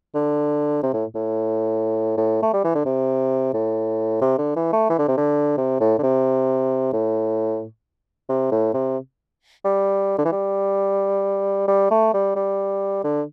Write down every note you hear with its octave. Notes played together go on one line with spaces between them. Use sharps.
D3
C3
A2
A2
A2
A3
G3
E3
D3
C3
A2
C3
D3
E3
A3
E3
D3
C3
D3
C3
A2
D3
C3
A2
C3
A2
C3
G3
D3
E3
G3
G3
A3
G3
G3
D3